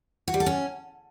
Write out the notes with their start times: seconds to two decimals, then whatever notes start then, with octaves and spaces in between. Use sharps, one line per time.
0.28 F#4
0.34 G3
0.40 A4
0.46 C#4